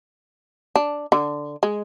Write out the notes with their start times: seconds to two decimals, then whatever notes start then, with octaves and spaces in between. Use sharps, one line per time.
0.76 D4
1.12 D3
1.63 G#3